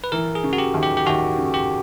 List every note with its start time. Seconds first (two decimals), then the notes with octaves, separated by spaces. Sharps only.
0.04 B4
0.12 E3 A#4
0.35 G#4
0.44 C#3
0.53 F#4
0.58 G4
0.74 D#2
0.83 G4
0.97 G4
1.06 D#2 F#4
1.38 C#3
1.54 G4